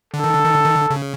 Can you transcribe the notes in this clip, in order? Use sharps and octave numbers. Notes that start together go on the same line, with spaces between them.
D3 A4
D#3
D3
D#3
D3
D#3
D3
C#3